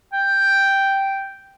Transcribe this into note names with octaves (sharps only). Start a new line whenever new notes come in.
G5